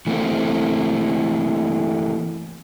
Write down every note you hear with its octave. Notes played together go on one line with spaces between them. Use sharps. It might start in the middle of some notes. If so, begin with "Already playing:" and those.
E3 A3 A#3 C4